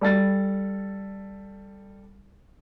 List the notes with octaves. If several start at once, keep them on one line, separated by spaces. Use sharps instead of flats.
G3 A4 A6